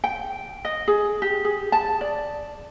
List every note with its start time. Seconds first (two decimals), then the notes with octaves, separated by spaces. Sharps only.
0.04 G5
0.65 D#5
0.88 G#4
1.22 G4
1.45 G#4
1.72 A5
2.01 D5